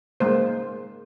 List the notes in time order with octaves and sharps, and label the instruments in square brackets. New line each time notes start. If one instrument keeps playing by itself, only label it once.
[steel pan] G#3 A#3 C5